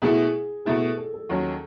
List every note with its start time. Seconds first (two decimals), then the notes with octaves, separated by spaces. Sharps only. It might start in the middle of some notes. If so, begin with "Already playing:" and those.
0.02 B2 A3 E4 G#4
0.65 B2 A3 E4 G#4
0.82 A4
0.98 A4
1.14 A4
1.29 D#2 D#3 F#3 C#4